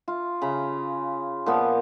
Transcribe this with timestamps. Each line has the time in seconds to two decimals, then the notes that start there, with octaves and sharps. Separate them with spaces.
0.08 F4
0.41 C#3 A#5 B5
1.46 A#2 F3 B3